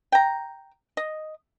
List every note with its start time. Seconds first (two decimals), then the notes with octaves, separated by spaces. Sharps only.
0.12 G5 A#5
0.97 D#5